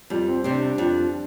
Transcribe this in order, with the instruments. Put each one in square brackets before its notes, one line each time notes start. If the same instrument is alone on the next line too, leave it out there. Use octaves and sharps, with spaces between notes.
[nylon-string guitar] F2 [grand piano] G3
[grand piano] C4
[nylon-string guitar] C3 G3 C4 [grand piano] D4
[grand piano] D4
[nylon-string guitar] F2 [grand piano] G4